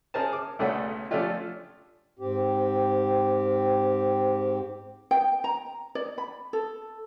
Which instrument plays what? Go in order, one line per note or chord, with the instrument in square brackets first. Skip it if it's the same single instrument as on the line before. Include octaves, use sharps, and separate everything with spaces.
[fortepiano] C#4 G#4 A#4 C5 A5
D6
B1 C#3 A3 C#4 D4 F#5
F3 A3 C#4 D4 F4 G4
[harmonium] G#2 C4 G4
[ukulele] G5
A#5
D5
B5
A4